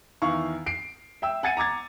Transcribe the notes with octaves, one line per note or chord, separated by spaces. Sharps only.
E2 D#3 E4 F5 C#6
C7 D7
E5 G5 E6
F#5 G#5 A6 C#7 D#7
A#5 D6 G#6 A6